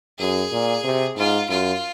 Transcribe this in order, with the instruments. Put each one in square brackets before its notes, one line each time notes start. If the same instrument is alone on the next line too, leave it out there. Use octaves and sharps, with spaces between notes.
[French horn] F#2 [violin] G#4
[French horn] A#2
C3
[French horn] G#2 [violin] F4
[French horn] F#2 [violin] F4